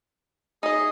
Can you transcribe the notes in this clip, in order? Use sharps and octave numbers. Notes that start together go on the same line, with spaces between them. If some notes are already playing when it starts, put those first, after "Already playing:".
D#4 G#4 D#5